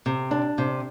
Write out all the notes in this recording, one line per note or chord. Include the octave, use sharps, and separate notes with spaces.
C3
D4
C3